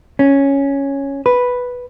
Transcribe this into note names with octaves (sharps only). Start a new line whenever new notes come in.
C#4
B4